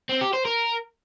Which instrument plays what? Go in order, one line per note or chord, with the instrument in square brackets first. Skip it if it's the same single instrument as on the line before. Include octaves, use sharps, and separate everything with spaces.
[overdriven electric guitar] C4
G4
C5
A#4